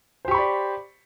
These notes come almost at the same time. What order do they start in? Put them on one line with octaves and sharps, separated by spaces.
C5 G4 C#6 B5 D5